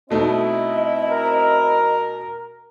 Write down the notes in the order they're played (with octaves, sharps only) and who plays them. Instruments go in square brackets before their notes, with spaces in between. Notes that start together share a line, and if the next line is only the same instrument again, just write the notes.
[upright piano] B2 A3 D#4 [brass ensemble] C4 E4 [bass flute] D#5
[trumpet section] A#4